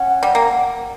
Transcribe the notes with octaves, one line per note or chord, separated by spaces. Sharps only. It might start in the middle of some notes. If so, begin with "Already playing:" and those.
Already playing: C#4 F#5
G3
A#3